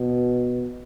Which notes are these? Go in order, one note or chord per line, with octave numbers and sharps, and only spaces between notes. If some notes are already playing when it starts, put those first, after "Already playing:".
Already playing: B2